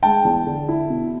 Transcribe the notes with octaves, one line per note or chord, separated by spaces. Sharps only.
G#3 G5 A5
E2
D3
E4
B2